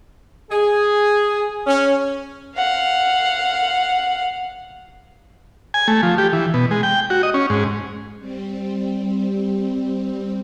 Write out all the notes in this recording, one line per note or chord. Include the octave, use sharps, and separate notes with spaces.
G#4
C#4
F5 F#5
G#5
A3
F3
G4
E3
B2
G#3
G5
F#4
D#5
C#4
G#2
G3 C4